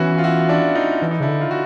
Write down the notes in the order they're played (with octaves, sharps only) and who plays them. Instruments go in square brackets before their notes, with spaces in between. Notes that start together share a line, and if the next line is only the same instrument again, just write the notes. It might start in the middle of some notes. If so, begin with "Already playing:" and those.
Already playing: [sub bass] E3 [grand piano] B3 C#4 E4 F#4
[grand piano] F4
E4 F#4
D4 E4
D#4 F4
[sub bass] E3 [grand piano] E4
[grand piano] D#4
[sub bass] C#3 [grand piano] D4 E4
[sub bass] D3
[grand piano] F4
F#4